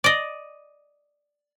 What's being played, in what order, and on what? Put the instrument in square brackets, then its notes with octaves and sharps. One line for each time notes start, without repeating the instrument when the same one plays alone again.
[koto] D5 D#5